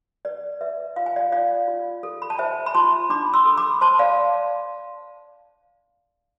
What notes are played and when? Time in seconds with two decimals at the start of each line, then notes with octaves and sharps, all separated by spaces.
0.25 B4 D5
0.61 B4 E5
0.96 F4 F5
1.06 G#5
1.16 D5 F5
1.32 F4 D5 F5
1.68 F4
2.03 A4
2.22 B5
2.30 A5
2.39 C5 E5 G#5
2.66 B5
2.75 F4 A5 C6
3.10 D4 B5 D6
3.34 C6 E6
3.45 A4
3.57 B5 D6
3.81 C5 A5 C6
3.99 D5 F5